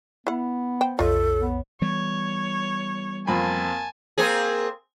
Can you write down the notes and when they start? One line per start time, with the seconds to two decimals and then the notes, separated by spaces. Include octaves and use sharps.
0.27 B3 E4 F#5
0.81 C5 G5
0.99 B1 F2 F4 A4 C#5 D#5
1.40 B3
1.81 E3 G3 B3 C#5
3.27 F2 A#3 C4 G#5 A5 B5
4.18 A#3 C4 G#4